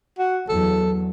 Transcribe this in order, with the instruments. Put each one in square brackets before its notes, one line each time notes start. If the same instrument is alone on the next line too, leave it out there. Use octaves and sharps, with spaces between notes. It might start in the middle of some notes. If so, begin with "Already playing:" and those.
[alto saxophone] F#4
[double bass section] E2 F#3 [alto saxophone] A4